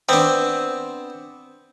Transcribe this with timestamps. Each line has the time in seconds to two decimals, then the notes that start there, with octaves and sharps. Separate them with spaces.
0.09 B3 C4 D4